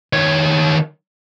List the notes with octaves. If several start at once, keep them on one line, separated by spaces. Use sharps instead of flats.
D#3 C#5